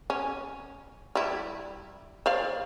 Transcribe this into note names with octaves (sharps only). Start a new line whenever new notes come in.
C#4
G3 E4
C5 D5 F5